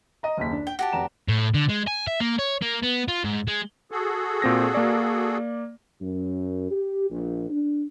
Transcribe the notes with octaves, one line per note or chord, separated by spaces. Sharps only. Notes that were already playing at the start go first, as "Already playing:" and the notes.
D#5 A#5
F#1 D#2 B6
D4
G5 G7
F#4 G4 A5
F1 A#5 E7
A2
D3
G#3
G#5
E5
A#3
C#5
A#3
B3
F4
G#2
G#3
F#4 G#4 A4
A#2 C4 A#6
A#3 D5
F#2
G4
A#1
D4